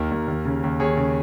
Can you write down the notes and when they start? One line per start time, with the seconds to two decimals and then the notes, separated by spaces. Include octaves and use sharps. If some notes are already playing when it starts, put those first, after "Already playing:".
Already playing: D#2 D#3 A#4
0.11 D#2
0.28 D#2
0.45 C#3
0.63 D#2
0.80 D#2 G#4 C#5
0.97 C#3